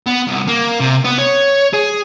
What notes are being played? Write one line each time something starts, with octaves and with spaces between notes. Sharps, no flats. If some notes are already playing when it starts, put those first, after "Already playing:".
B3
C2
A#3
C3
B3
C#5
G#4